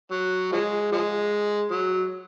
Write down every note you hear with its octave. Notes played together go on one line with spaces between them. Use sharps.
F#3
F3 G#3
F3 G#3
F#3